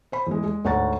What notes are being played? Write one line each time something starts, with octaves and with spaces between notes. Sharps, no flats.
C5 B5
E2 G#3
G#3
D2 G#2 C#5 F#5 A#5 A6